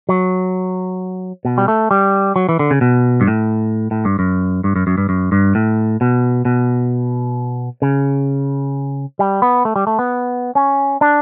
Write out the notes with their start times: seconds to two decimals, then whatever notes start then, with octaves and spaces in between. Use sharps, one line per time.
0.09 F#3
1.45 B2
1.58 G3
1.68 A3
1.91 G3
2.36 F#3
2.49 E3
2.59 D3
2.71 C#3
2.81 B2
3.21 G2
3.27 A2
3.91 A2
4.05 G2
4.19 F#2
4.64 G2
4.76 F#2
4.87 F#2
4.98 G2
5.09 F#2
5.32 G2
5.55 A2
6.01 B2
6.45 B2
7.82 C#3
9.19 G3
9.42 B3
9.65 A3
9.76 G3
9.87 A3
9.99 B3
10.55 C#4
11.01 D4